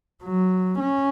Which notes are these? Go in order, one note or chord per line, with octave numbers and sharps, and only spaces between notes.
F#3
C#4